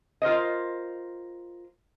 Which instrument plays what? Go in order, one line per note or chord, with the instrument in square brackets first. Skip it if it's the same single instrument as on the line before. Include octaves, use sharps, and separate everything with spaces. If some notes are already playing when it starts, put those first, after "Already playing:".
[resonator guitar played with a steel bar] F4 A#4 C5 D#5